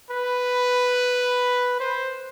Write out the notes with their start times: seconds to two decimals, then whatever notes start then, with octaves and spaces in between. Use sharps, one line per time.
0.10 B4
1.80 C5